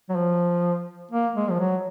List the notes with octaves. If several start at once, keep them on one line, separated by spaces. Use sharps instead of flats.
F#3
F3
A#3
G#3
F3
F#3